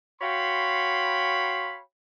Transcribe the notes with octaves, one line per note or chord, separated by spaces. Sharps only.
F#4 C#5 F5 G5 B5 C6